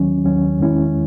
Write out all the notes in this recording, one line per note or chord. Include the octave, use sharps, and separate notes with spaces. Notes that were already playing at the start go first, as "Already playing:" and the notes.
Already playing: D#2 D#3 F#3 C#4
D#2 D#3 F#3 C#4
E2 D#3 G#3 C#4 E4